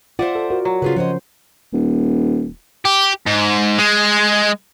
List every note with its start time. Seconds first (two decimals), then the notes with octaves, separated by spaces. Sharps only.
0.19 F4 C5 D5 E5 F#5
0.35 A4
0.50 F#4 A#4
0.65 F#3
0.82 C#3 F4 G#4 B4
0.96 F3 F#4 C5 C#5 D#5
1.73 D#1
2.85 G4
3.27 G#2
3.78 G#3